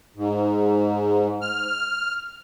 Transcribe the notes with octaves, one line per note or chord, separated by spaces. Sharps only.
G#2
F6